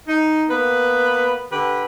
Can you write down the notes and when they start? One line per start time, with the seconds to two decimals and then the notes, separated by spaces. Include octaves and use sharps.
0.08 D#4
0.49 A#3 B3 B4
1.52 D3 G4 B4